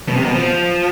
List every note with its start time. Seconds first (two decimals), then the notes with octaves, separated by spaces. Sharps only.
0.08 B2
0.16 C3
0.25 B2
0.34 F3